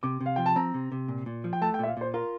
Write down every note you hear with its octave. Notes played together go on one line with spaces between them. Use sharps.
C3 D6
C3
F5
F3 G5
A5
C4 A#5
C3
C3
A#2
A#2
F3
G5
A3 A5
G5
A#2 E5
F5
A#2 C5
F4 A#4